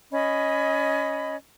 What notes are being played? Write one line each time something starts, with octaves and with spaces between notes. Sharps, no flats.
C#4 D#5 B5